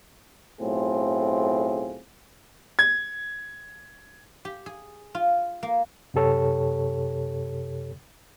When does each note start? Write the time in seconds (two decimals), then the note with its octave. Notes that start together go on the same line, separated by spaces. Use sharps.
0.61 B1 A2 A3 C4 F4 G#4
2.79 G#6
4.45 G4
4.66 G#4
5.15 F4
5.63 A#3
6.14 F#2 C3 G4 A4 C#5